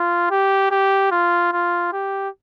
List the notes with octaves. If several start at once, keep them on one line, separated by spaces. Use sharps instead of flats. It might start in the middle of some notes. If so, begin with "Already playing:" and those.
Already playing: F4
G4
G4
F4
F4
G4